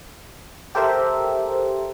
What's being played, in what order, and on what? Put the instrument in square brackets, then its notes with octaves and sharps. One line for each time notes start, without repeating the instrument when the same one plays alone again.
[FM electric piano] G4 A4 A#4 C5 E5